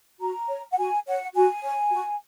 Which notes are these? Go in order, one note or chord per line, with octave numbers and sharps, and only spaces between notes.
F#4 A#5
C#5
F#5
F#4 G#5
C#5 F#5
F#4 G#5
C#5
F#4